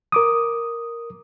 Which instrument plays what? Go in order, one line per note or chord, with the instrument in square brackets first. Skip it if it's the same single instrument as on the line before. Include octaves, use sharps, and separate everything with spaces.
[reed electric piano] A#4 D6 D#6